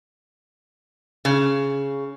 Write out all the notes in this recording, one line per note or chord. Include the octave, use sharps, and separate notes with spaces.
C#3